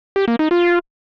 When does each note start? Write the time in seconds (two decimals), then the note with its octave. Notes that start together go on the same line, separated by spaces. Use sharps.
0.16 G4
0.28 A#3
0.39 D#4
0.51 F4